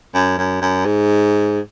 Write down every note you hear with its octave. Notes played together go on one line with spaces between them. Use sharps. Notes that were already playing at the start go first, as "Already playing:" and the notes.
F#2
F#2
F#2
G#2